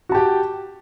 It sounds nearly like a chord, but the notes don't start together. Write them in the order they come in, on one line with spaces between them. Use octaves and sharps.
F#4 A5 G4 G5